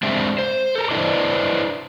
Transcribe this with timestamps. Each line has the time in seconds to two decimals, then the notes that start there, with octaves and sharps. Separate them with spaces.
0.03 G#3 C4 D4 G4 E5
0.39 C5
0.76 A4 A#4
0.91 D4 E4 B4 C5 D5 D#5